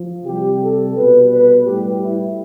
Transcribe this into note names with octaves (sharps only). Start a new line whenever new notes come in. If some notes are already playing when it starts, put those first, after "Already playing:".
Already playing: F3
C3 G3 G4
A4
B2 G3 B4
B4
A2 G3 G4
E4